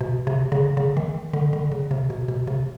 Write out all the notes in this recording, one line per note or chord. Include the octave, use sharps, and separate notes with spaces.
B2
C3
C#3
C#3
D#3
D3
D3
C#3
C3
B2
B2
C3